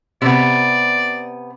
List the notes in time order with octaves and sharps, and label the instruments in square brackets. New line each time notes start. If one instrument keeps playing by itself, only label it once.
[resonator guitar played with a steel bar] C3 B3 [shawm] D5